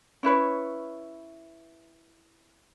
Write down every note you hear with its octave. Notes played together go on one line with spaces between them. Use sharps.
C#4 E4 B4 C#5